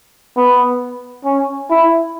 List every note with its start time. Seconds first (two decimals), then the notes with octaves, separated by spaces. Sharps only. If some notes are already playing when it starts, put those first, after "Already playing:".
0.37 B3
1.25 C#4
1.70 E4